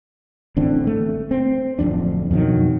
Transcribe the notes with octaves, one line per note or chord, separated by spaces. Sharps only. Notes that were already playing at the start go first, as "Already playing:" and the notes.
A1 D3 C4 D4
A3
C4
D1 G1 F2 D4
F2 B2 D#3 F#3